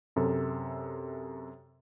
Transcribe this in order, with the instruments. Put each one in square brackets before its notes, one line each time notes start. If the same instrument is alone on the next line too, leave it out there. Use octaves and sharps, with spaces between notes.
[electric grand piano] F#2 C3 A4